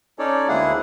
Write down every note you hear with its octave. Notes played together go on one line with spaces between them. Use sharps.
C#4 D#4 A4 C#5 D5
D2 G#3 A#3 E4 G#4 F#5